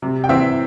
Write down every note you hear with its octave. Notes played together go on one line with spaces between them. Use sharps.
C3
G5
E3 C4 E5